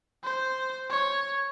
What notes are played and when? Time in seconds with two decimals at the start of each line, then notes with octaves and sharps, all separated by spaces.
0.24 C5
0.90 C#5